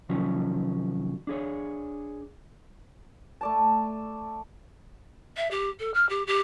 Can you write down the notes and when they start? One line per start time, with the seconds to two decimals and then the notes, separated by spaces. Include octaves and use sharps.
0.09 C3 D#3 F3 F#3 C#4
1.27 D4 G#4 C#5
3.41 A3 D5 A5
5.37 E5
5.50 G4
5.79 A4
5.94 F6
6.09 G4
6.26 G4